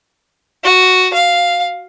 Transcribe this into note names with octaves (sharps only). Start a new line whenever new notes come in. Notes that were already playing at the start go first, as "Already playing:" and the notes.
F#4
F5